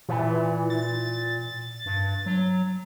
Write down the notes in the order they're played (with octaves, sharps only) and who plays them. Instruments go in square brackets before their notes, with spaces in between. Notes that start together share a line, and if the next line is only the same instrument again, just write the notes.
[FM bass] A#2 [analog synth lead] E3
[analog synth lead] A6
[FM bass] G2
F#3